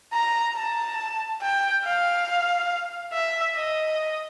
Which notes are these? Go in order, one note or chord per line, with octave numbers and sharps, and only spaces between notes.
A#5
A5
G5
F5
E5
D#5